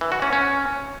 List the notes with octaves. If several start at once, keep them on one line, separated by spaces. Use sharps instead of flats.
E3
F#4
C#4
C#4